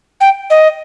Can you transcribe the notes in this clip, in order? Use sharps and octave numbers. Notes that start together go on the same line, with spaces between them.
G5
D#5